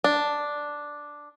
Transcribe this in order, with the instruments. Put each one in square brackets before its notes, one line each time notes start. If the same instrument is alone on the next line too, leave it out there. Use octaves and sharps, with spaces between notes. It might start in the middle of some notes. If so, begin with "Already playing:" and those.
[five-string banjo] D4